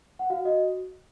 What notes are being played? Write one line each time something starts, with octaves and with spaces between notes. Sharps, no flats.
F#5
F#4 F5
F#4 D#5